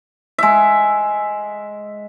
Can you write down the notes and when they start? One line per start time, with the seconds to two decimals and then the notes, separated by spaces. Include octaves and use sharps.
0.38 G#3 E5